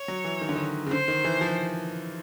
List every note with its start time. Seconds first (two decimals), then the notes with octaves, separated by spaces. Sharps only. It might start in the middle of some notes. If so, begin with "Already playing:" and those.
Already playing: C#5
0.08 F#3
0.24 E3
0.41 D#3
0.49 D3
0.55 D#3
0.86 C#3
0.91 D3 C5
1.08 D#3
1.25 E3
1.41 F3